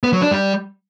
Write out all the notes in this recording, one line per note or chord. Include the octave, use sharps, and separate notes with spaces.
B3
F#3
D4
G3